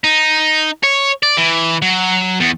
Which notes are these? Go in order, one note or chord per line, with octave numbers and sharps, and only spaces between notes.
D#4
C#5
D5
E3
F#3
E2